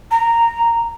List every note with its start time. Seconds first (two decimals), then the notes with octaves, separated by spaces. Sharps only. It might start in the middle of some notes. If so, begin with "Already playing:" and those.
0.11 A#5